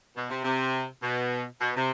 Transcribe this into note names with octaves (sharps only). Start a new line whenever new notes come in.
B2
C3
C3
B2
B2
C3